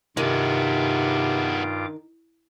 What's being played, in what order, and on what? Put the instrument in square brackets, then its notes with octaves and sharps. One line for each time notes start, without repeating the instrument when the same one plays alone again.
[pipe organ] G2 F4 D6 [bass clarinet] C3 [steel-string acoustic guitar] D#3 [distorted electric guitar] G#3 B3